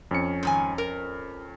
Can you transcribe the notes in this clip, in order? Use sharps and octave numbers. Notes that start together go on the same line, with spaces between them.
F2 C#4 C#7
G#2 D#3 G#5
A#4